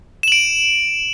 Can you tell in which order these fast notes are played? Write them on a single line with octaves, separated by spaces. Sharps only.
E7 F#7 D7